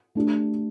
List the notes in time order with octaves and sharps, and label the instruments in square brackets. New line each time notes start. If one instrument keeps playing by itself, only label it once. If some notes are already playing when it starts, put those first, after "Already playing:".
[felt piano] A3 D4 G4